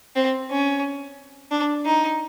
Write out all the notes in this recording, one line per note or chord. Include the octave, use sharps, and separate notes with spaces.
C4
C#4
D4
D#4